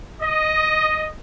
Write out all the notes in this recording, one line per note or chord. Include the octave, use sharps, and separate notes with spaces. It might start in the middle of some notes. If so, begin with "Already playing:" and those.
D#5